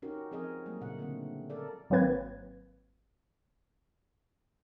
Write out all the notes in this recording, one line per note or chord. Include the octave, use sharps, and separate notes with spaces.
C#4 D#4 F#4 G4 A#4
F3 C4 G#4 A#4 D#5
F#3 G3 A3 A#3
A#2 C#3 F#5
D3 A3 C4
A4 A#4 D5
G#1 F#3 A#3 C4 B4 G#6